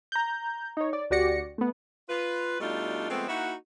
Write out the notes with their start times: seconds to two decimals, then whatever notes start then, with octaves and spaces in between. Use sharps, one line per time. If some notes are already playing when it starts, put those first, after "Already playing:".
0.12 A#5 G6
0.77 D#4 C#5
0.93 D5
1.11 D2 F#4 G4 D5 A#6 C#7
1.58 A3 B3
2.09 F4 B4
2.60 B2 G3 A3 D4 D#4 F4
3.09 F3 G#3 A3 B3 C4
3.28 A#3 D#4 E4 F#4